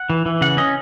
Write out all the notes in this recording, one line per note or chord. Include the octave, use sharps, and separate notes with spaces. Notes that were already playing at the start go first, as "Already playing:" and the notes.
Already playing: F#5
E3
E3
C#3 F#5
C#4 D#5